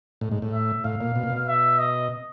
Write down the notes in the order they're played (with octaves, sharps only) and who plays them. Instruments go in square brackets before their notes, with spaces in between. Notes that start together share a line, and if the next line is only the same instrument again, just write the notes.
[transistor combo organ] A2
G#2
A2
[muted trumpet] E5
[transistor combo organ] A2 [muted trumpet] F5
[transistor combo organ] A#2
B2
A#2
B2
[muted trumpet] E5
D#5